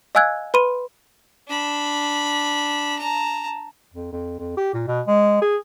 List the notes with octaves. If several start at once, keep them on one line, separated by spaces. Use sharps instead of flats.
D#5 F5 G#5 E6 F#6 G#6
B4 B5 C6 D#7
D4 B5
A5 A#5
F2
F2
F2
G4
A#2
B2
G#3
G#4